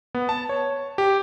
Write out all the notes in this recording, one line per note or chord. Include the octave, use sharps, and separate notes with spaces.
B3
A5
C#5
G4